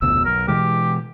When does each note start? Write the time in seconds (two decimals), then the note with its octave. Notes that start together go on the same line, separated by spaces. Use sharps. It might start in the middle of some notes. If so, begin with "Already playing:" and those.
0.02 F1 D2 B2 E6
0.25 B1 A#4
0.48 B2 E3 G#3 G4